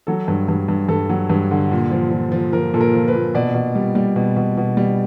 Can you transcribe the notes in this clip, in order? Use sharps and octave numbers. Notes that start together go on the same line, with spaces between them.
F#3 A4
G2
G2
G2
G2 A4
F#3
G2
D3
A#2
F3
F3
F3
F3 A#4
A#2 A4
A#4
F3
B4
A#2
B2 D5
B2
G3
G3
B2
B2
B2
G3